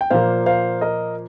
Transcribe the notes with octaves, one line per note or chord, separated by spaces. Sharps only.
G5
A#2 F3 A#3 C5 F5
C5 F5
A#4 D#5